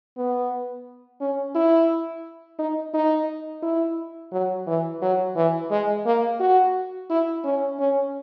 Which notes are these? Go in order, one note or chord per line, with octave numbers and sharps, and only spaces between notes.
B3
C#4
E4
D#4
D#4
E4
F#3
E3
F#3
E3
G#3
A#3
F#4
E4
C#4
C#4